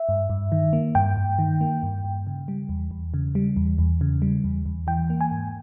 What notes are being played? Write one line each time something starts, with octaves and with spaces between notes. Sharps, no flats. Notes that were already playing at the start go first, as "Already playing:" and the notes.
Already playing: E5
G2
G2
D#3
A#3
G2 G5
G2
D#3
A#3
G2
G2
C#3
G3
E2
E2
C#3
G3
E2
E2
C#3
G3
E2
E2
E3 G5
A#3
G#5
G#2